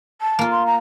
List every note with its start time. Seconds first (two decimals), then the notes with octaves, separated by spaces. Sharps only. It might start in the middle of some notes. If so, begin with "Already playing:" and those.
0.21 A5
0.39 A#3 F4
0.52 C6
0.67 A#5